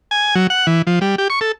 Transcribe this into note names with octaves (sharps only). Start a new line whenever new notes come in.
G#5
F#3
F#5
E3
F3
G3
G4
C#6
A4